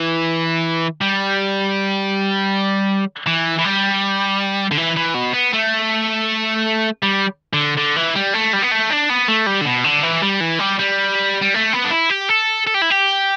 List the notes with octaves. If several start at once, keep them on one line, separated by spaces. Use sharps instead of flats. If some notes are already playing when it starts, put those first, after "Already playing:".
Already playing: E3
G3
E3
E3
G3
D3
E3
E3
B2
B3
A3
G3
D3
D3
E3
G3
A3
G3
B3
A3
D4
B3
A3
G3
D3
B2
D3
E3
G3
E3
G3
G3
G3
A3
B3
D4
E4
G4
A4
A4
G4
E4
G4